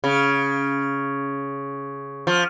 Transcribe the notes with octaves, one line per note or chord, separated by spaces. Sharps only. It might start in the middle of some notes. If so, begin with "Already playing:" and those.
C#3
F3